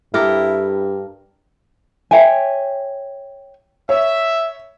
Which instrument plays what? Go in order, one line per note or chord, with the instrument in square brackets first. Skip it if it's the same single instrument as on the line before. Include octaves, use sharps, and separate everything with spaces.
[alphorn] G2 [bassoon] E4 [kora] G4 A4 A#4
[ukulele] C#5 E5 G5 G#5
[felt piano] C#5 [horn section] E5